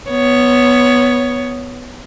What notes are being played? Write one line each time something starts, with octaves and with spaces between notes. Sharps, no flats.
B3 C#5